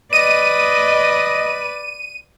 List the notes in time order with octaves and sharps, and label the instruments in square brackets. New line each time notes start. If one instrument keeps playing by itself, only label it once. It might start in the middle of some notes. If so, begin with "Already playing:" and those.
[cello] B4 D5 [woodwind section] D#5 [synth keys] D#7